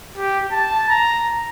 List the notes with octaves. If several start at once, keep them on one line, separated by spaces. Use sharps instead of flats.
G4
A5
A#5